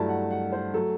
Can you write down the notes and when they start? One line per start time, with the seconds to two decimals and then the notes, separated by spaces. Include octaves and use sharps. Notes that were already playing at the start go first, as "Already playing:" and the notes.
Already playing: G2 F#3 A3 E4 A5
0.09 F#5
0.31 F#5
0.52 C5
0.74 F#3 A3 A4